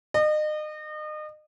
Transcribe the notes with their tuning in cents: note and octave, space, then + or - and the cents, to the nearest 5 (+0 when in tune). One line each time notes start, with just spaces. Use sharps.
D#5 -35